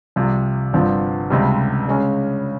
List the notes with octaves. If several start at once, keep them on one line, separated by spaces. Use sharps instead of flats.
C2 C3 F3
G1 G2 F3 C4 F4
C#2 C3 G3
C#3 G#3 C#4